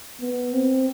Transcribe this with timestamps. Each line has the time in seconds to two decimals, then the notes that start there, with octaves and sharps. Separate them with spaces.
0.21 B3
0.53 C4